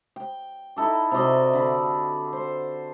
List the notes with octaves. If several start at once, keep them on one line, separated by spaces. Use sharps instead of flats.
G5
D#4 E4 A4 D6
C3 F#4 D5 D#5
D3 B5
C5